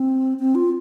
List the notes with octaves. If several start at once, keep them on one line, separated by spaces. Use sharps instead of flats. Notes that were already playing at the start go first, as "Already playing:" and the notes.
Already playing: C4
C4
F4